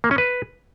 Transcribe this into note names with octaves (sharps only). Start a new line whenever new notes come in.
A#3
C#4
B4